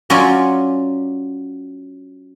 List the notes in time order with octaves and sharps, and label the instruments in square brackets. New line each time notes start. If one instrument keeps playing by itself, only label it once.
[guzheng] F#3 C#4 F4 F#4 D5 G#5